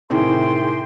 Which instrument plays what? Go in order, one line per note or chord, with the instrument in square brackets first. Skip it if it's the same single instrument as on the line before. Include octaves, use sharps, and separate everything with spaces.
[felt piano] A2 C3 D#3 [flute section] G#4 G5 C6